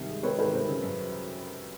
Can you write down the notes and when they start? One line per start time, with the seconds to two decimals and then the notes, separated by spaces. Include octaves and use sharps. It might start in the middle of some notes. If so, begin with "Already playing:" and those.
Already playing: C2 C3 D#3
0.09 G#3
0.23 C4 B4 C#5
0.38 D#3 A4 B4
0.53 C3 A#4 C5
0.69 C#3
0.82 F#2